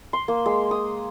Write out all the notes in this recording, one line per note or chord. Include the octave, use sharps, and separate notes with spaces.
C6
A#3
G#3
D#6